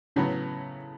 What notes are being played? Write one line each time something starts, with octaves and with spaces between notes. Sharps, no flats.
A2 C#3 F#3 B3